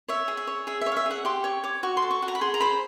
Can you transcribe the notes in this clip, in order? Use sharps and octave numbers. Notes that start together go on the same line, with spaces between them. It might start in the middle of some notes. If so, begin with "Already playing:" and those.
C#5 E5
G#4
E5
C#5
G#4 E5
E5
C#5
F5
E5
G#4 F#5
G4 C6
C#5 C#6
C#5 D6
F#4 C#6
C6
A4
C#6
F#4
A#5
B5
G#4 C6
A#5
C5 B5